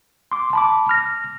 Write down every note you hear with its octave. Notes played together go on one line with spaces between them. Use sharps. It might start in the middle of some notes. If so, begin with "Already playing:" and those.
C6 D6
A5 B5 D6
F6 A#6